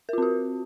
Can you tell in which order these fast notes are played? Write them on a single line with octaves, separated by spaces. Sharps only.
A#4 F4 C4 F#4